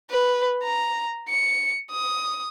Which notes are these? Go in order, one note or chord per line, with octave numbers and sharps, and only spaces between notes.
B4
A#5
C#7
D#6